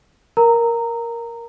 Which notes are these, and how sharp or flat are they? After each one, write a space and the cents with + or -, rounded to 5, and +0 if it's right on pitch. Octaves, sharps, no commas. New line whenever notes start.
A#4 +5 A#5 -15